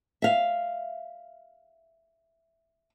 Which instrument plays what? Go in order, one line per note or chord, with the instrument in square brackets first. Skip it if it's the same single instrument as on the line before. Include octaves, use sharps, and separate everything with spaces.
[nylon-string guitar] E5 F5